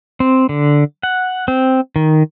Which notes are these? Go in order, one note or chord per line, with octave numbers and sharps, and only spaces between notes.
C4
D3
F#5
C4
D#3